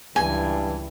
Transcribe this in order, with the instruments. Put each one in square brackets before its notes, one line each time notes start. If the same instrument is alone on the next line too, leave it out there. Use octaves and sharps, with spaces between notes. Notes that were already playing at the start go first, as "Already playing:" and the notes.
[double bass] C#2 E3 [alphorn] G2 [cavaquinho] G#5